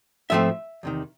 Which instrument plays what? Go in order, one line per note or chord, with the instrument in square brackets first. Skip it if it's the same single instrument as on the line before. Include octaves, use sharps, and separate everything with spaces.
[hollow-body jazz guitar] G#2 F3 A3 C4 E5
E2 C3 D#3